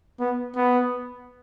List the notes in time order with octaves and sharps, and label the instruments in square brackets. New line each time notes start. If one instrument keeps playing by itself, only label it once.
[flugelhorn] B3
B3